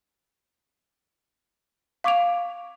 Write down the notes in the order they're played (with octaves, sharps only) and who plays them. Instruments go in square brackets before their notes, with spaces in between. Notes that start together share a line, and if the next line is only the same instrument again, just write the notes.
[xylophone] F5 C#6 D6 G#6 D7 F7